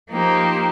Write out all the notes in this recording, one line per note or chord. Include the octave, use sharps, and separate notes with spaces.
F3 A#3 D#4 G4 C5